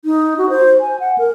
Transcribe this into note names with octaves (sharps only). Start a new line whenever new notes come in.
D#4
F#4
C5
G#5
F#5
A#4